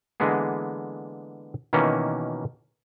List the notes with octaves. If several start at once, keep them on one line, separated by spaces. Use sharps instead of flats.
D3 E3 G#3 A#3 B3 G#4
B2 D#3 E3 A#3 C#4